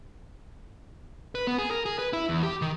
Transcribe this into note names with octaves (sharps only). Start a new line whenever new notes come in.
B4
B3
G#4
A#4
G#4
B4
E4
E2
G4
D#3